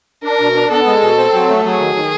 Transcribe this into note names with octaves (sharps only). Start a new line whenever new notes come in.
D4 A#4
B2
D4
B3 A4
G#3
B2
C4
F#3
A3
F#3 G#4
D#3
D#3